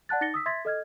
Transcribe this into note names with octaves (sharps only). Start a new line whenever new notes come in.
D5 F#5 A5 F#6 A6
D#4 A6 A#6 C#7 G7
D#6 E6 B6
E5 C6 G#6 A6 B6
A4 D#5 F6 G#6